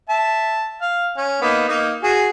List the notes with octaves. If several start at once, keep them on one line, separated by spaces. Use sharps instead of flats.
E5 A5
F5
C#4
A#3 B3 D#4
A#3 D#4
F#4 G#4